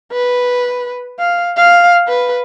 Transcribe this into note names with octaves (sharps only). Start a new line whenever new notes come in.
B4
F5
F5
B4